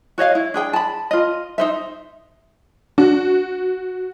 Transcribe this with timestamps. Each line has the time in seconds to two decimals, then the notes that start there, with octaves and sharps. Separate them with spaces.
0.18 F#4 C#5 D#5 F5
0.35 E4
0.54 D4 G#4 G5
0.73 A5 B5
1.11 F4 D#5
1.58 D#4 C5 E5
2.98 D4 F#4